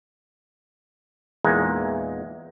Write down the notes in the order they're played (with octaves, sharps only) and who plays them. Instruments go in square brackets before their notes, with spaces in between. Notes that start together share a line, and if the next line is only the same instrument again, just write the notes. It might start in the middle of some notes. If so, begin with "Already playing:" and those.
[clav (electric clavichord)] E2 A#2 E3 G#3 A#3 D#4